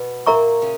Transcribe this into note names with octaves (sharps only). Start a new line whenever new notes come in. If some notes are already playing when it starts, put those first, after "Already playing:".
Already playing: B2 B3
A#2 A#3 A#4 E5 A#5 C#6
C#3 C#4